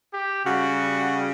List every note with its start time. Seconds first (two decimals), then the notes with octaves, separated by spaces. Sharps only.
0.14 G4
0.46 C#3 G3 F#4